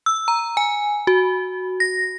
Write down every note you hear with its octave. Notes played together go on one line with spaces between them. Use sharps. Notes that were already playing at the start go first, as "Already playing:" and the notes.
E6
A#5
G#5
F#4
A#6